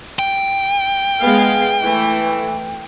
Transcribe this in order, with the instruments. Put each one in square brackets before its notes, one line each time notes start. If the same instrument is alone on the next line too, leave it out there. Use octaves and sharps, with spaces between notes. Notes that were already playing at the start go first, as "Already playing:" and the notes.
[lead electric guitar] G5
[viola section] G#3 B3 F5
E3 A3